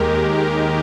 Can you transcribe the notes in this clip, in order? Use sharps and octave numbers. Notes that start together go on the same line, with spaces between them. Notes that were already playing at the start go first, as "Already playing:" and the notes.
Already playing: D#2 D#3 G#3 G4 A#4